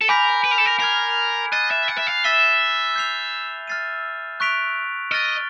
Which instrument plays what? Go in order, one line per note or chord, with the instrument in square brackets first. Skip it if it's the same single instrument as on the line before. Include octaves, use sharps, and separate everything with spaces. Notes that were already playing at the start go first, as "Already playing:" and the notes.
[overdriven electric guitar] A4
[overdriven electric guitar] A#4 [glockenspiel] G#5 B5 D6 G6 B6
[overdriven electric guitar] B4
A#4
A4
A#4
[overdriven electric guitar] A#4 [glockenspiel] F6 G#6 C7
[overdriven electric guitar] D#5 [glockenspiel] F#6 A6 C7 D#7
[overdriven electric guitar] E5
F#5
E5
F5
[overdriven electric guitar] E5 [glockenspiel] E6 A6 C7 D#7 G7
[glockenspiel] G6 C7 F7
F6 A6 C7 D#7
C#6 F#6 B6 D7 F7
[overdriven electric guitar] D#5 [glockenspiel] F6 A6 D7 G7